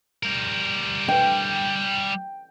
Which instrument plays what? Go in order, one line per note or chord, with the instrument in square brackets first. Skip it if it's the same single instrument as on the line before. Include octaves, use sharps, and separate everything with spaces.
[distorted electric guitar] G3 A#4
[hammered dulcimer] G5